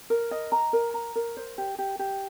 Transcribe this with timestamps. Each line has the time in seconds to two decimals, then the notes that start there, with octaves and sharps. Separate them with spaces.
0.10 A#4
0.31 D#5
0.52 A#5
0.73 A#4
0.94 A#5
1.16 A#4
1.37 C5
1.58 G4
1.79 G4
1.99 G4